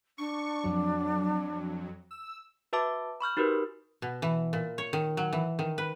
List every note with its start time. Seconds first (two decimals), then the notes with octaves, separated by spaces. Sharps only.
0.18 D4 C#6
0.64 F2 F#3
2.11 E6
2.73 F#4 B4 E5 A5 D6
3.21 B5 C#6 F6 G6
3.37 D#4 F#4 G4 A#4 B4
4.02 B2
4.22 E3
4.53 A#2
4.78 C#5
4.93 D#3
5.17 F#3
5.33 E3
5.59 D#3
5.78 B4